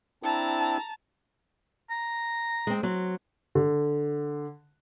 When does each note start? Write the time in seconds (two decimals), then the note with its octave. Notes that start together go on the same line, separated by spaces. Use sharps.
0.23 C4 D4 E4 A5 A#5
1.90 A#5
2.67 G#3 C4
2.83 F#3 C4
3.55 D3